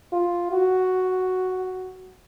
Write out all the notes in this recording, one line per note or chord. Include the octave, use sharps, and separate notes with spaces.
F4
F#4